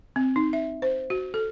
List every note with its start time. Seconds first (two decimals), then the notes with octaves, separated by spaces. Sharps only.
0.16 C4
0.36 D#4
0.53 E5
0.82 C5
1.10 F#4
1.34 A4